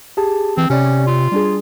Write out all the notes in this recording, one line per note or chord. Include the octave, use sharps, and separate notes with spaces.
G4 G#4 A5
E3 C4
C3 C#4 G4 C#5 D5
F4
G3 D4 G#4